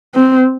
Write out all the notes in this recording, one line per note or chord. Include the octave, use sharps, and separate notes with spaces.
C4